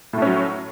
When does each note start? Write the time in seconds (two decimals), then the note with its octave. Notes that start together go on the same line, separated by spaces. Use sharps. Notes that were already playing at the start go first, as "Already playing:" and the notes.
0.13 A2
0.18 A3
0.22 C#4
0.27 F#3